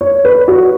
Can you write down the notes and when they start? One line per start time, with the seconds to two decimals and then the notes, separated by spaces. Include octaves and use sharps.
0.01 C#5
0.25 B4
0.48 F#4